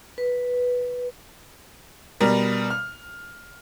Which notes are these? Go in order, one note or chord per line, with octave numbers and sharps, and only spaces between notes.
B4
B2 G3 A#4
F6